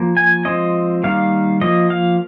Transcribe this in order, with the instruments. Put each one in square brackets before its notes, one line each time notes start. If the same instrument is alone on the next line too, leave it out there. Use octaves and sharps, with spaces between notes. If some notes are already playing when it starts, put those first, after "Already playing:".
Already playing: [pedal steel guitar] F3 A#3
G#5
F3 G#3 C4 D#5
D#3 G3 A#3 F5
F3 A#3 D#5
F5